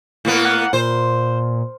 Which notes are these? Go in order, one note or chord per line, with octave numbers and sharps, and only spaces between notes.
A2 A#3 B3
F#5
A#2 C5